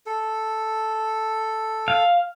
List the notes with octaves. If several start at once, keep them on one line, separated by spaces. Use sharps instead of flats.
A4
F5